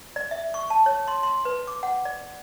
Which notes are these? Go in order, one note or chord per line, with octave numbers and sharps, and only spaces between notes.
D5
E5
C#6
A5
C#5
C6
C6
B4
D6
F#5
D5